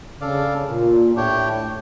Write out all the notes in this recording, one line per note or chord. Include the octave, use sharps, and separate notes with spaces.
C#3 D4 A4 D5 F5
A#2
A2 D4 G4 C#5 G5